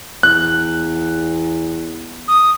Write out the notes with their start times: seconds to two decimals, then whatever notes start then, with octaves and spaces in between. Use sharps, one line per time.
0.23 E2 F#6
2.28 D#6